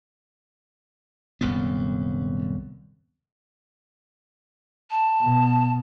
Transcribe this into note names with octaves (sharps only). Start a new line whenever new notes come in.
D#1 C2 F#2 B3
A5
B2